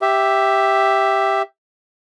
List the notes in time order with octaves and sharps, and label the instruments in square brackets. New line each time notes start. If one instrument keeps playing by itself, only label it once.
[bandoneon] G4 E5